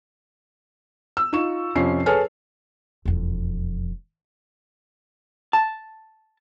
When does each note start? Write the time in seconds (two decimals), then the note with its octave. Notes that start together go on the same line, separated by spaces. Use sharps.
1.17 E6
1.33 D#4 F4 C#6 E7
1.76 F2 C3 F3 C#4 C7
2.06 G#4 A4 B4 C#5 F6
3.05 E1 F2
5.53 A5